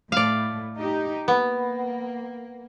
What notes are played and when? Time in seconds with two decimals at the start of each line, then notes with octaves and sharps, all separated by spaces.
0.12 A2 A3 D5 F5
0.77 D#4 G4
1.28 A#3 B3